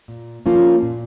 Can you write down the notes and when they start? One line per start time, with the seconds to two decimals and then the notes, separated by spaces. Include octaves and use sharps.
0.08 A#2
0.46 F3 A#3 C#4 F4
0.83 A#2